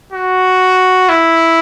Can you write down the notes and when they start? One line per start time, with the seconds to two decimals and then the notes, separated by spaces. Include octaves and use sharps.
0.13 F#4
1.09 E4